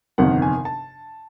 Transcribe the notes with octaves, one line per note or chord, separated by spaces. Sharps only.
G1 F2 C3 D#3 F#5
G#5
A5